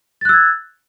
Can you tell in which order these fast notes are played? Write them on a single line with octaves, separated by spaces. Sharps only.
A6 F#6 E6 G#6